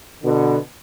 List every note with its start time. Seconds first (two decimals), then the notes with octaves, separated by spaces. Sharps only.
0.23 B2 D3